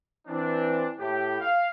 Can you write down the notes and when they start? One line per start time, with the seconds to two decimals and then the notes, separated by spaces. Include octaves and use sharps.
0.27 E3 C4 D4
0.99 A2 G4
1.40 F5